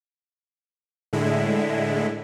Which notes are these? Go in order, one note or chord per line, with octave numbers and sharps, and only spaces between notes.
A2 D3 G#3 E4